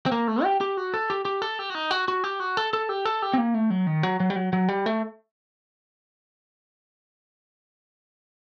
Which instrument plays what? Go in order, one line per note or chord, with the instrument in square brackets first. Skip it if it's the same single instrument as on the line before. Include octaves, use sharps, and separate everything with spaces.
[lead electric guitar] C4
A#3
A3
G4
G4
F#4
A4
G4
G4
A4
G4
F#4
D#4
F#4
F#4
G4
F#4
A4
A4
G4
A4
G4
C4
A#3
A3
F#3
D#3
F#3
F#3
G3
F#3
F#3
G3
A3